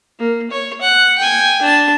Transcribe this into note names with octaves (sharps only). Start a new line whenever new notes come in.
A#3
C#5
F#5
G5 G#5
D4 A5